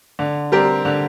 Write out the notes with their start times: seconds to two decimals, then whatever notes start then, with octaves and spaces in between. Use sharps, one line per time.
0.19 D3
0.52 G3 C4 G4 A#4
0.85 D3